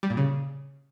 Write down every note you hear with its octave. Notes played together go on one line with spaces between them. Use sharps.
G3
A#2
C#3